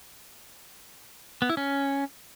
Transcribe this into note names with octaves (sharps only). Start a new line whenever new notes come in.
B3
E4
C#4